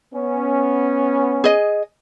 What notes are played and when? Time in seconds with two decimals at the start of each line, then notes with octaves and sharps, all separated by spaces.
0.13 B3 C#4
1.44 G#4 D#5